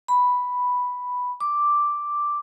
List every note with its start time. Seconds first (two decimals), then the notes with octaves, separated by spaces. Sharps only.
0.08 B5
1.40 D6